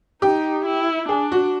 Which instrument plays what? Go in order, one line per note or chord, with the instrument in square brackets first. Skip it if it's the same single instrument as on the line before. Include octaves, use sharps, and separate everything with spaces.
[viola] D#4 [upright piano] G4
[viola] E4
[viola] D4 [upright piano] G#4
[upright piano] F#4